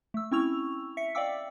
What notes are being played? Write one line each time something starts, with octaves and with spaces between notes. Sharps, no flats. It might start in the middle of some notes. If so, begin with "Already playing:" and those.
A3 E6
C4 C#4 E4 C#6 E6 F7
E5 B6 C#7
D5 D#5 F5 G5 D6 E6